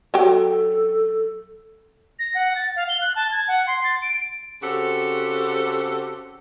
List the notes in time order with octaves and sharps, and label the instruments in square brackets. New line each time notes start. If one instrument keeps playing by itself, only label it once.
[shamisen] F#3 G4 [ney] A4
[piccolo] A#6
F#5
A6
F5
G7
F#6
A5
G#6
F#5
C6
A6
D7
[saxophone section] C#3 C4 F#4 G4 A4